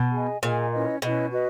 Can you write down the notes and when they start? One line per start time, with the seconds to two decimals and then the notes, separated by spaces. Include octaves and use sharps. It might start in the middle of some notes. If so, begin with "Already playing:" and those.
Already playing: B2
0.13 G#4 D#5 G#5
0.42 A#2 G#4 D#5 G#5
0.72 C#4 E4 B4 D#5
1.02 B2 C#4 E4 B4 D#5
1.31 F#4 B4 D#5